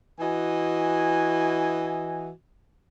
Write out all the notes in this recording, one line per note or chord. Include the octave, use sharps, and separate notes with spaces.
E3 E4 F#4 D#5 G#5